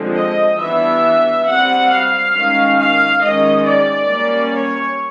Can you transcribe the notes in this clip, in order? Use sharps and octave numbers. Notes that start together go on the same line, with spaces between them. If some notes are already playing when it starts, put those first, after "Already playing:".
Already playing: D3 F3 G#3 C4
D#5
E3 G3 B3 D4 E5
G3 C4 F#5
F5
D#3 G#3 C#4
F5
D#3 G#3 C#4 D#5
D5
G3 A#3 C#4
C#5